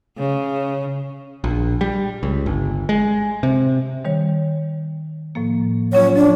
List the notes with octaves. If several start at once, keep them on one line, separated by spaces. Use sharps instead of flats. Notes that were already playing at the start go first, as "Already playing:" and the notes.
C#3
A#1
G3
C#2
G1
G#3
C3
D#3 G3 C#5
A2 F3 A#3
F#3 C#4 F4 C#5
F3 D4